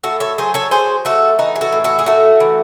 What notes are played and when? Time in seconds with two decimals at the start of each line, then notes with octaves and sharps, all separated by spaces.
0.04 A2 F#4 A4
0.20 A4 C#5
0.38 F#3 G#4 C5
0.54 A4 C#5
0.71 F#3 G#4 C5
1.05 A3 F#4 A4
1.39 E3 D#4 F#4
1.56 G#4
1.61 F#4 A4
1.72 A2
1.84 F#4 A4
1.99 G#4
2.06 A3 F#4 A4
2.40 E3